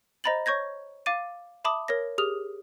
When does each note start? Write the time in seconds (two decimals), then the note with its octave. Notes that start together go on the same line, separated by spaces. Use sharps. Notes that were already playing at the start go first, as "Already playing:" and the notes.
0.24 C5 D#5 A#5 B5 A6 F#7
0.46 C#5 C#6 G6 G#6 A#6
1.06 F5 D6 A6 D#7
1.64 E5 A5 B5 D6 D#6
1.88 A#4 C#5 A#6
2.18 G4 G#4 D#6 F6 F7